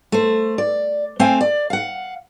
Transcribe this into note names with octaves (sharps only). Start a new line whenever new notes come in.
A3 C5
D5
A3 C4 C5 F5 G5 G#5
D5
F5 F#5